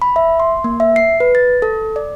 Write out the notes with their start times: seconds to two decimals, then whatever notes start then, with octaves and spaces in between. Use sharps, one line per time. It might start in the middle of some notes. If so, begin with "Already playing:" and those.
0.02 B5
0.16 E5
0.40 C6
0.64 A#3
0.80 E5
0.96 C7
1.20 B4
1.35 A6
1.62 A4
1.96 D5